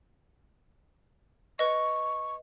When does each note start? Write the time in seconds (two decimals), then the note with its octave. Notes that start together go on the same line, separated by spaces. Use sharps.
1.59 B4 D#5 C#6